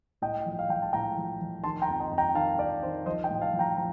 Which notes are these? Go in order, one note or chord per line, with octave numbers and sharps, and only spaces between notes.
A2 D#5 G5
F3 D#5
F5
F3 G5
A5
A2 G5 A#5
F3
F3
D#3 A5 C6
G5 A#5
F2
D#5 G5
F2
G5 A#5
D#3 F5 A5
F2 D5 F5
D#3 C5
F3 C5 D#5
D#5 G5
A2
F5 A5
F3
G5 A#5
F3 A#5